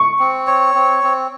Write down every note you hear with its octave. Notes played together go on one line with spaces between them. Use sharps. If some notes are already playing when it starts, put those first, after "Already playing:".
Already playing: C#6
C4
C#5
C4
C4